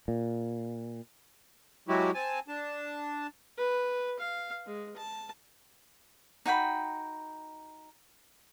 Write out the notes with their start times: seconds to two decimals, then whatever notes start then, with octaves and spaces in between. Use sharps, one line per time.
0.08 A#2
1.88 F#3 G#3 E4 F#4 G4
2.14 C4 G#5 A5
2.48 D4 A5
3.58 B4
4.19 F5
4.66 G#3
4.97 A5
6.46 D#4 F#4 G5 B5